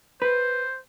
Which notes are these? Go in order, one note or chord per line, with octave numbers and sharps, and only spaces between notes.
B4 C5